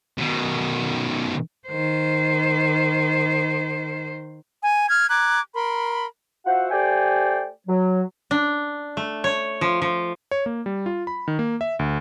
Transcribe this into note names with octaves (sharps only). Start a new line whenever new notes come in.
B2 D#3
D#3 C5
G#5
F6 G#6
A#5 D6 F#6 G#6
A#4 B5 C6
F4 F#4 C5 E5 F#5
A3 G4 C5 D5 G5 G#5
F#3
D4
A3
C#5
F3
F3
C#5
A#3
G3
F4
B5
D#3
A#3
E5
D2